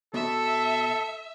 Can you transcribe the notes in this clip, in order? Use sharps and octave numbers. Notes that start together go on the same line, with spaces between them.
B2 A4 E5